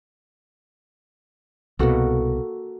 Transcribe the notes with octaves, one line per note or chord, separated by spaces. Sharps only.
C2 B2 A#3 F#4 A4